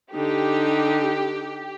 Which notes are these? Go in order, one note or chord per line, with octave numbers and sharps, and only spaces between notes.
D3 D#4 G4